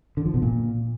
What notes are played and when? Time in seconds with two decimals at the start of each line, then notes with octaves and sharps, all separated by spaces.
0.17 D3
0.25 F3
0.34 B2
0.42 A#2